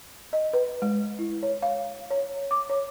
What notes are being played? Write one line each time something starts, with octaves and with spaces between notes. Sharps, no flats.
D#5
B4
G#3
E4
C#5
F5
C#5
D6
C#5